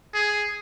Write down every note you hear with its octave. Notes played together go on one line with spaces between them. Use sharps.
G#4